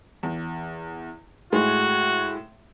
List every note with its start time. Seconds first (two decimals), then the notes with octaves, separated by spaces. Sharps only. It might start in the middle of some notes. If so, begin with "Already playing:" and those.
0.23 E2
1.52 A2 G#3 F#4